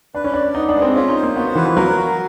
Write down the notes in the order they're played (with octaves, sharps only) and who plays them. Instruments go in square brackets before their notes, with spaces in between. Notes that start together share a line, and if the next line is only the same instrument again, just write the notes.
[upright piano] D4 [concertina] B4
[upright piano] C#4
[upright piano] D4 [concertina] D5
[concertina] B3 [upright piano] D#4
[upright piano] D4
[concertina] G#3
[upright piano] C4
[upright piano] C#4 [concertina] F4
[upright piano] D#4
[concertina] C5
[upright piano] A#3
[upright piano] B3 [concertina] F#4
[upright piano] E3 [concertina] B4
[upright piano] F3
[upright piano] F#3 [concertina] A#4
[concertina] F#4